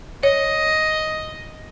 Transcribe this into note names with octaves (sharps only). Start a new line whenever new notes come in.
C#5 D#5